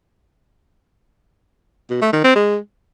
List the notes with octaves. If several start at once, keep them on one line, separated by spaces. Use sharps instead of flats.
B2
A3
D#3
C4
G#3